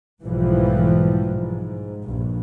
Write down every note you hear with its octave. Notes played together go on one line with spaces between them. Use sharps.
B1 G#2 E3 F3 G3
G#2
A#1 G2